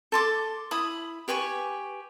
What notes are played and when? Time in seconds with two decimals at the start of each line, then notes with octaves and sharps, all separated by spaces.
0.12 A4 C6 D6
0.71 E4 B5 D#6
1.28 G4 B4 G#5 C#6